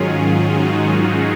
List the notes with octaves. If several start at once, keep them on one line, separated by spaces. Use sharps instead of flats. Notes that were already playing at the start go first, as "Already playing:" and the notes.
Already playing: G#2 D#3 F#3 C#4 F4 G#4
D#4 F#4
F4